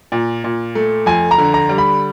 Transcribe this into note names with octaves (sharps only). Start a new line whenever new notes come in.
A#2
A#2
A3
F2 G#5
A#5
D3
A#5
G3
B5